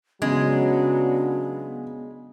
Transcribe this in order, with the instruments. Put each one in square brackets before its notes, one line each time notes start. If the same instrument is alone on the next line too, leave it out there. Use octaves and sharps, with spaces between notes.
[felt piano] C#3 [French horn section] F#3 D4 [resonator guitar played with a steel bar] G#3 [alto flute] B3